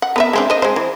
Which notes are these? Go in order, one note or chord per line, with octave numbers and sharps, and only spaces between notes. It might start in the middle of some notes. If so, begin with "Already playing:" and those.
F#5
B3 B4 E5
G#3 C4 D4
C5 D#5
G#3 C5
E3